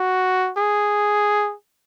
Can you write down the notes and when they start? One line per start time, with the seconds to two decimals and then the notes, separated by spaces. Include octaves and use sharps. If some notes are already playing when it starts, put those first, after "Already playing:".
Already playing: F#4
0.58 G#4